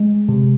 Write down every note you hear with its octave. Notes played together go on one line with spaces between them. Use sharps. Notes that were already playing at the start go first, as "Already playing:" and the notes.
Already playing: G#3
C3